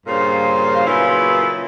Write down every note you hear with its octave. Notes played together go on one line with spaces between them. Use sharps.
G2 A#2 C#3 C5 F5
A#2 C#3 F#3 B3 E4 F4